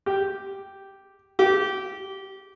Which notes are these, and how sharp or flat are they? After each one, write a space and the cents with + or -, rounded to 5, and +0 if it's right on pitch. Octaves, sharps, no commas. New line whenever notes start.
G4 -5
G4 -20